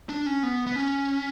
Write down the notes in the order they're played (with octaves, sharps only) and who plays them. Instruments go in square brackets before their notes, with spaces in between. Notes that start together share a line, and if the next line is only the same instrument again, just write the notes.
[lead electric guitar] D4
C#4
B3
B3
C#4